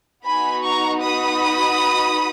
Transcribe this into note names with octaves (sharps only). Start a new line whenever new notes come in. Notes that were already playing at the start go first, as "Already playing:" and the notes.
B3 D#4 F#4 G#5 B5
A#5 C#6
B5 D#6